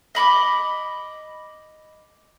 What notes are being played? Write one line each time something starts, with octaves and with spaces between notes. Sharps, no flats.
D#5 B5 C#6 D6